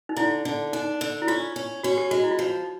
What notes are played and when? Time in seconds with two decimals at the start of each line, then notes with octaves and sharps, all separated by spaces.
0.09 D#4
0.17 D3 E4
0.45 D3
0.73 D4 D#4
1.01 D3
1.22 E4
1.28 C#4 F4
1.56 C#4
1.83 C#4 F#4
1.98 G4
2.11 G#3 F#4
2.23 E4
2.31 F4
2.39 F3 F#4